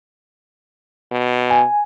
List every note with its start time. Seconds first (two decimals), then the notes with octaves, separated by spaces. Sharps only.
1.12 B2
1.50 G#5